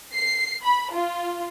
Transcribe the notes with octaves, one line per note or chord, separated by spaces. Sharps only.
C7
B5
F4